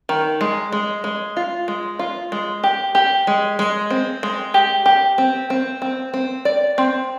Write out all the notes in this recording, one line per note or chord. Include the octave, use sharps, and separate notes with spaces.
D#3
G#3
G#3
G#3
F4
G#3
F4
G#3
G4
G4
G#3
G#3
C4
G#3
G4
G4
C4
C4
C4
C4
D5
C4